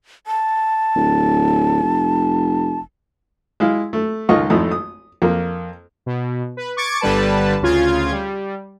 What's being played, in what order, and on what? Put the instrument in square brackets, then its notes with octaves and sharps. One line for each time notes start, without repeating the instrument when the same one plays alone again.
[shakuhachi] A5
[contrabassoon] D1
F1
[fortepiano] G#3 E4 F5
A3
C#2 D#3 F4 A4 D#5 C#6
G#1 F2 A3 D#4 E4 D#6
D#6
F2 A#3
[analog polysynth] B2
B4
C#6 D6 G#6 A6 C#7 D7
G1 D3 G3 B4 A5
D2 C#3 F4 G#6
G3